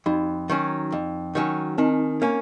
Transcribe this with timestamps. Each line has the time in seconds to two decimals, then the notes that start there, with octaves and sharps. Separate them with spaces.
0.06 F2 D#4
0.50 D#3 F#3 C#4
0.92 F2
1.35 D#3 F#3 C#4
1.78 D#3 C4
2.22 A#3 C#4